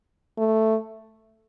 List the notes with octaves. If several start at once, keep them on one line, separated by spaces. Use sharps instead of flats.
A3